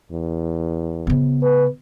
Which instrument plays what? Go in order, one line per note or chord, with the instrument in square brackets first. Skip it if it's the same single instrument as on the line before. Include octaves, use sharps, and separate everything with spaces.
[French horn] E2
[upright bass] C#3 B3
[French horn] B4